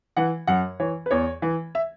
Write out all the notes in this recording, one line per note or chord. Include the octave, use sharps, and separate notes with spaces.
E3 F#5
F#2 F#5
E3 C#5
B4
E2 C#5
E3
E5